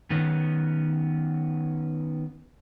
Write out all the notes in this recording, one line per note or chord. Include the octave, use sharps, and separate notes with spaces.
D#3 B3 C#4